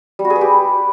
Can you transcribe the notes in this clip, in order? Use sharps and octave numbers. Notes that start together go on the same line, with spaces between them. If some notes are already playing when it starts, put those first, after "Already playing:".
G3
F#4
G#4
B4
G4